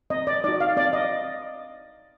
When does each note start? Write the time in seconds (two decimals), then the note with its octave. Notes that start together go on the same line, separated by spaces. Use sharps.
0.10 C4 D#5
0.27 D5
0.44 D#4 F#4 D5
0.60 F5
0.77 C4 D5
0.93 D#5